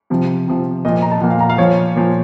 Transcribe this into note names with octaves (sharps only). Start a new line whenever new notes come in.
C3 F3
C3 F3
A#2 F3 D#5
A#5
A5
A#2 F3 F#5
F5
A#5
F5
A#2 F3 C#5
A#2 F3